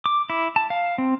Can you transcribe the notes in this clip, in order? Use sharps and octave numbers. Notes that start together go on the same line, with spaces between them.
D6
E4
A5
F5
C4